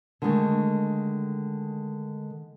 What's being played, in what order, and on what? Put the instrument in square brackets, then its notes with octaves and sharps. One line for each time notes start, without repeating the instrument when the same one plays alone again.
[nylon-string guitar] D3 D#3 G#3 A3